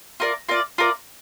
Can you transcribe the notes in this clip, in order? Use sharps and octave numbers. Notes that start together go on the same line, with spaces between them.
F4 A#4 D5
F4 A#4 D5
F4 A#4 D5